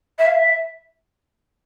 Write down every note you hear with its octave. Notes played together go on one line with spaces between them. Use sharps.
E5
F5
E5